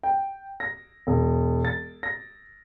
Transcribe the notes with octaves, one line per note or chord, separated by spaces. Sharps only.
G5
A#6
E1
A6
A#6